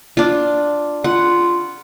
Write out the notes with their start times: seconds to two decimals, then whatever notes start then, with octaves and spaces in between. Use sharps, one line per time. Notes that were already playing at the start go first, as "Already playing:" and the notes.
0.17 D4 F4
1.04 F4 F#5